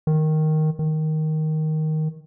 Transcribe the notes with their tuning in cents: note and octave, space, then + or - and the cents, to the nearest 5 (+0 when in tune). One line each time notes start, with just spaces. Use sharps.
D#3 +0
D#3 +5